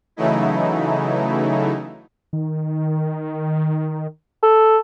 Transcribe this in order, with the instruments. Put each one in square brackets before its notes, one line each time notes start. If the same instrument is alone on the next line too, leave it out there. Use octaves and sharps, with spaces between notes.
[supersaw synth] C#3 E3 F#3 A3 D#4 E4
[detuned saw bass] D#3
[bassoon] A4